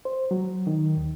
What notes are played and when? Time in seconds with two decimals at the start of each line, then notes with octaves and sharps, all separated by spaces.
0.05 C5
0.31 F#3
0.67 D#3
0.97 D#2